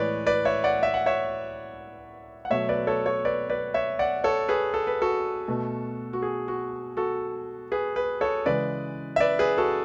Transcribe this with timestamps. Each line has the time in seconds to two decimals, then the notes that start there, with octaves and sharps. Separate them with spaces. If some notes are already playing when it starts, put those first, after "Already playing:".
Already playing: A2 E3 G#3 B4 C#5 D5
0.26 B4 D5
0.45 C#5 E5
0.64 D5 F#5
0.83 E5
0.94 F#5
1.06 C#5 E5
2.45 F#5
2.50 B2 F#3 A3 C#5 E5
2.69 B4 D5
2.87 A4 C#5
3.06 A4 C#5
3.25 B4 D5
3.50 B4 D5
3.74 C#5 E5
3.99 D5 F#5
4.24 A4 C#5
4.49 G#4 B4
4.74 A4
4.87 B4
5.02 F#4 A4
5.48 B2 A3
6.13 F#4
6.22 G#4
6.48 F#4
6.97 F#4 A4
7.72 G#4 B4
7.96 G#4 B4
8.21 A4 C#5
8.46 C#3 E3 G#3 B4 D5
9.16 E5
9.20 B4 D5
9.39 G#4 B4
9.58 F#4 A4